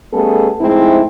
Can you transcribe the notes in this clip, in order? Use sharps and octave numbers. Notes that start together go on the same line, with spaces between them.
G3 A3 B3 C#4 G#4 A4
F2 G#2 G#3 A3 C4 E4